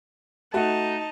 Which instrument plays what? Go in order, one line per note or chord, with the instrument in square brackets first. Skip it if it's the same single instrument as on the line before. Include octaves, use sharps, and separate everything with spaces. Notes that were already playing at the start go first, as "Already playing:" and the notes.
[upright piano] A3 F#4 [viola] D#4 A5